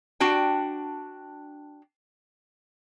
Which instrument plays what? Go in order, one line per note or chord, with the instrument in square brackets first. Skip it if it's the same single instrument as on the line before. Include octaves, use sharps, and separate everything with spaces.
[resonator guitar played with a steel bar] D4 F#4 G5